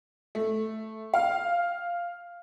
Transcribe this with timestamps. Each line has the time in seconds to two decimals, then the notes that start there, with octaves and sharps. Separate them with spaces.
0.35 A3
1.14 F5